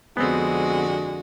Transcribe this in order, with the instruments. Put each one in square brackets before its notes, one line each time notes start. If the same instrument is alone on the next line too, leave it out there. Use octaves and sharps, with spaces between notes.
[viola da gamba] F2 D3 F#4 [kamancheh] G#3 [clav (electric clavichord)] B3 C4